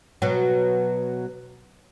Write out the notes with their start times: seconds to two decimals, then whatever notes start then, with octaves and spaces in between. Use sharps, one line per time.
0.22 B2 F#3